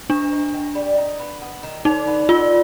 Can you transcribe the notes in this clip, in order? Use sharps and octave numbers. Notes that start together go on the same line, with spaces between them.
D4 D#4
D#4
D#3
G3
D#4
B3
B3
D#3
D3 D#4
B3
D3 F4